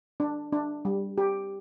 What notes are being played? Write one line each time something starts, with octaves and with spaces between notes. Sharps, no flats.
D4
D4
G3
G4